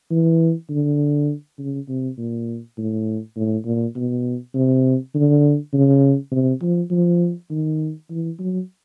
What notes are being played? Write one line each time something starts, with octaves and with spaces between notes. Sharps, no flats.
E3
D3
C#3
C3
A#2
A2
A2
A#2
B2
C3
D3
C#3
C3
F3
F3
D#3
E3
F#3